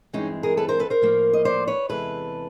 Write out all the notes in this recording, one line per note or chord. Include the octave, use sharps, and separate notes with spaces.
G2 E3 G#3 C4 C#4 D#4
G#4 A#4
A4 B4
A#4 C5
A4 B4
A#4 C5
A2 F3 A#3
D#5
C5 D5
B4 C#5
E2 C3 E3 G#3 A4 B4